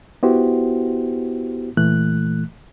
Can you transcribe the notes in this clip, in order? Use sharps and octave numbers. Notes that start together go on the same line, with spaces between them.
B3 E4 F#4 G4 C5
A#2 E3 A3 F#6